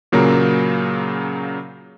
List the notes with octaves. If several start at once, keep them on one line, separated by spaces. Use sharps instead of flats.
A#2 C#3 F#3 A#3 A#4